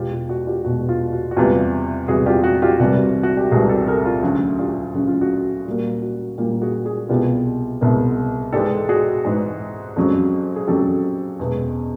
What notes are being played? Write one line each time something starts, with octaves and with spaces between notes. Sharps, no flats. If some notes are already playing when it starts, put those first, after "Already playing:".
Already playing: E2 B2 G#3 F4 G4
F4
F#4
F4 G4
E2 B2 G#3 F#4
F4
F#4
F#4
E2 C3 E3 G3 F4 G4
E2 C3 E3 G3 F#4 G#4
F4 G4
F#4
F4 G4
C2 C3 E3 G3 F#4
F#4
G4
C2 C3 E3 G3 F#4 G#4
G4 A4
G#4 A#4
F4
D2 C#3 F#3 F#4
F4 G4
D2 C#3 F#3 F#4
F4
F#4
A#2 G3 A#3 F#4
F#4
A#2 G3 A#3 F4 G4
F#4 G#4
F#4 G#4
C2 B2 G#3 B3 F4 G4
C2 B2 G#3 B3
G#2 E3 G#3 G4 A4
F#4 G#4
G#2 E3 G#3
F2 C#3 F#3
G#4
F2 C#3 F#3 G4 A4
E2 B2 G#3 B3